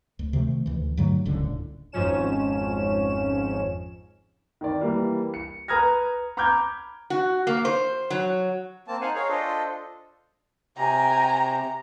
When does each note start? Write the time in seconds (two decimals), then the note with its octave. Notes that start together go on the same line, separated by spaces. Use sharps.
0.19 D2
0.33 C3 D#3 F3 A3
0.66 D2 E3
0.97 G2 D3 F#3 A3
1.26 D#1 C#2 A2 D3
1.92 G#1 F2 G#2 F3 C#4 E7
4.61 D#3 D5
4.81 E3 G3 A#3 G4
5.34 C#7
5.68 B4 A#5 D#6 F6 G#6 A#6
6.37 A#5 B5 D6 F6 G6 G#6
7.10 F#4
7.47 A#3
7.65 C5
8.10 F#3
8.88 A#3 C4 A5
9.01 D#4 C5 F5 F#5 G#5
9.15 G#4 A#4 C#5 F5
9.29 D4 F4 A4 C5 D#5
10.77 C3 G5 G#5 A#5